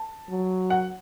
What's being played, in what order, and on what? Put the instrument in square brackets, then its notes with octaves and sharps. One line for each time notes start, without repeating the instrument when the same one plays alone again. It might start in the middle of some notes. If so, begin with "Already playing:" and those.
Already playing: [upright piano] A5
[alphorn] F#3
[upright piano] F#5